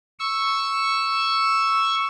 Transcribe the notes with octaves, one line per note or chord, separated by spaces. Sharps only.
C#6 E6